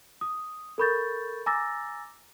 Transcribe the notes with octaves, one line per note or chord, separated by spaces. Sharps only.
D#6
A4 A#4 B5 C#6 G6 A6
G#5 A#5 D6 E6 A6 A#6